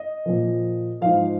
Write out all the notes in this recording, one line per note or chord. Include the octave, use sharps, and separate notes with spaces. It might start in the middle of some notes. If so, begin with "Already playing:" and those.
Already playing: D#5
A#2 F3
G#2 F3 F5